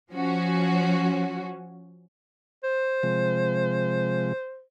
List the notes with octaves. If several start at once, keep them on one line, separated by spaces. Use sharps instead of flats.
F3 C#4 F#4
C5
C3 F3 G#3